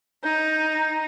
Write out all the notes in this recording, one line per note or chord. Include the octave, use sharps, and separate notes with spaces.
D#4 G6